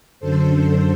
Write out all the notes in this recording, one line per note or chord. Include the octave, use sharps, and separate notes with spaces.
F#2 D3 A4 C5